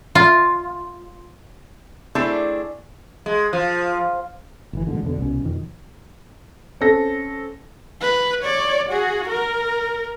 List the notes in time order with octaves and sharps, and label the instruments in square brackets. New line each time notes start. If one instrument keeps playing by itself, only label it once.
[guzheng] F4
[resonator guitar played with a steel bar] A3 C4 D4 E4 G#4 A4
[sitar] G#3
F3
[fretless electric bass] G1 C3 E3
A1 G#2 B2 D3
F2 B2 D3
C2 B2 C#4
F2 B2 D#3
[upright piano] C4 C#4 A4 A#6
[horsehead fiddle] B4
C#5 D5
F#4 G#4
A#4